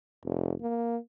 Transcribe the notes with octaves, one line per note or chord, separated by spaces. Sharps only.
F1
A#3